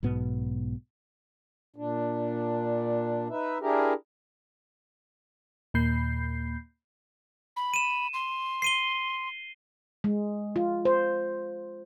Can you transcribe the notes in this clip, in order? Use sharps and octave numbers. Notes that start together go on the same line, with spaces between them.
B1 G#2 B2 B3
A#2 D4
D#4 B4 E5
D4 E4 G4 G#4 A#4
D#2 A#2 A#3 B5 G6 C7
B5
D#7 E7
C6
C7 D#7 G7
G#3
F4
C5